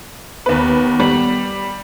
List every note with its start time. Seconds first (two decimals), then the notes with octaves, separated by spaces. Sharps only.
0.46 D#2 B3 B4
1.00 G3